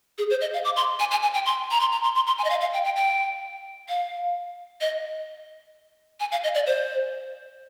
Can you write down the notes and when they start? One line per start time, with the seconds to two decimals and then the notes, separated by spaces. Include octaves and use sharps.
0.18 G#4
0.30 C5
0.41 D#5
0.54 F5
0.65 D6
0.76 C6
1.00 G#5
1.11 G#5
1.23 G#5
1.34 G5
1.46 C6
1.71 A#5
1.80 C6
1.92 A#5
2.04 C6
2.15 C6
2.27 C6
2.38 G#5
2.44 D#5
2.50 F5
2.61 F5
2.73 G5
2.85 G5
2.96 G5
3.89 F5
4.81 D#5
6.20 G#5
6.32 F5
6.44 D#5
6.55 D5
6.67 C5